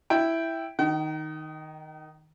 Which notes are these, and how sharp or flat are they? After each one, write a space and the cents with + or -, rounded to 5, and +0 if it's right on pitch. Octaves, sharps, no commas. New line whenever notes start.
E4 +0 G5 +0
D#3 +0 G5 -45